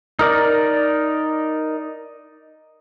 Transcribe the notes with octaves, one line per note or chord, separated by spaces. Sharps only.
D#4 A#4 D5 A#5